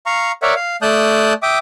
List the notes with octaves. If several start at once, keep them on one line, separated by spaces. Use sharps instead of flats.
F5 A#5 C#6
A#4 C#5 D5 E5 F#5
F5
A3 D5 A5 D#6 F#6 G6
E5 G5 D6 D#6